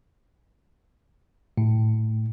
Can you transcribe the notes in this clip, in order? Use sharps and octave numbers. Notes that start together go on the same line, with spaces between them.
A2